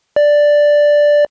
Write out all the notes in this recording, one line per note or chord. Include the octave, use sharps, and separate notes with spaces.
D5